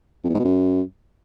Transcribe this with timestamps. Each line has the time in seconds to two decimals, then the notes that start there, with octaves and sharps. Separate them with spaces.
0.24 F2
0.29 E2
0.34 G#2
0.40 B2
0.45 F#2